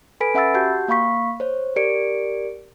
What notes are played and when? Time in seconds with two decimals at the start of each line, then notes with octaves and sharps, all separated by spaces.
0.20 A4 B4 G#5 B5 B6 D7
0.34 C#4 E5 F#5 B5 E6 A6
0.54 F#4 G4 F#5 A5 G6
0.88 A#3 F5 B5 C#6 B6
1.40 C5 C#5
1.76 G4 A#4 D5 C#7 D7